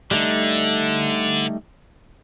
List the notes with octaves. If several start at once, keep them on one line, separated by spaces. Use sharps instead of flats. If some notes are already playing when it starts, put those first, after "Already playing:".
D3 G3 A3 D#4